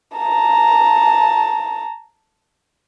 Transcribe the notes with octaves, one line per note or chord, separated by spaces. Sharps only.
A5 A#5